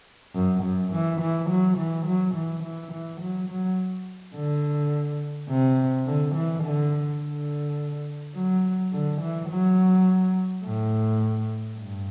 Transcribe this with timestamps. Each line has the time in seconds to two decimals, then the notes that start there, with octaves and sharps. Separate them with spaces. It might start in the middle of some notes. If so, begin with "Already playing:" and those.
0.35 F#2
0.63 F#2
0.93 E3
1.21 E3
1.50 F#3
1.78 E3
2.07 F#3
2.35 E3
2.63 E3
2.92 E3
3.21 F#3
3.50 F#3
4.35 D3
5.49 C3
6.07 D3
6.36 E3
6.64 D3
7.22 D3
8.36 F#3
8.93 D3
9.22 E3
9.50 F#3
10.65 A2
11.79 G2